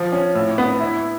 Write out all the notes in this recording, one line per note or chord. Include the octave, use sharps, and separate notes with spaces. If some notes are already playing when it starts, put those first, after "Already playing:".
Already playing: F3
C#4
A2
B3
E4